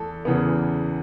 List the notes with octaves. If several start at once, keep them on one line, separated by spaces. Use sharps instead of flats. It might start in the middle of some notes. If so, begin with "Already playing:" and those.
Already playing: E2 A3 A4
E2 C#3 E3 B3